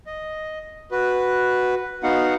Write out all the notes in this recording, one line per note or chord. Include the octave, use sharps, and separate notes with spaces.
D#5
F#4 B4
B3 D#4 F#4 F5 F#5